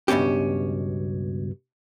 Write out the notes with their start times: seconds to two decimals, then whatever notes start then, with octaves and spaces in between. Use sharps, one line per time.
0.08 C#2 G2 B2 C#4 G4